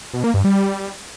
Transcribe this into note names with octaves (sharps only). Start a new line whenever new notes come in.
B2
A#3
G2
G3